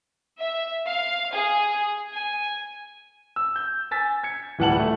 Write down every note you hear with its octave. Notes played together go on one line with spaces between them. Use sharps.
E5
F5
G#4
G#5
E6
G6
G#5 E6 A6 B6
G#6 C#7
D1 E3 G3 F#5 A5 F#7
A3